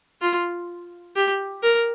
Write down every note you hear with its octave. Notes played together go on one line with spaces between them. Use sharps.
F4
G4
A#4